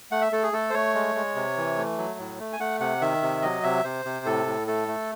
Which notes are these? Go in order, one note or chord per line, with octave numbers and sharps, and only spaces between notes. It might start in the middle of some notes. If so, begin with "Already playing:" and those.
A3 F#5
E5
A3 A4
G#4
A3 A4
C5
A3 C#5
G#3
G#3
C3
E3
A3
F#3
A2
A3
G#5
A3 F#5
C3 F#5
D#3 E5
C3
F#3 D#5
C3 E5
C3 C5
C3
A2 A4
A2
A3 A4
A3